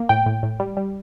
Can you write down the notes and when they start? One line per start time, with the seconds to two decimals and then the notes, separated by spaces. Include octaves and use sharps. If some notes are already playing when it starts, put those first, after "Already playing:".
Already playing: A#3
0.09 A2 G5
0.26 A2
0.43 A2
0.60 G3
0.77 G3